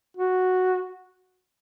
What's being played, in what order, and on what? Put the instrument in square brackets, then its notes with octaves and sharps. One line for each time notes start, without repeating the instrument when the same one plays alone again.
[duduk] F#4